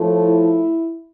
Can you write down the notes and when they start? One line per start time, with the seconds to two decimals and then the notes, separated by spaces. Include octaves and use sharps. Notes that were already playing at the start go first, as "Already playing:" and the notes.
Already playing: A2 F3 A3
0.24 E4